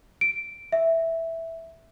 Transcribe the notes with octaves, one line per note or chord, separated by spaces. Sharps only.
D7
E5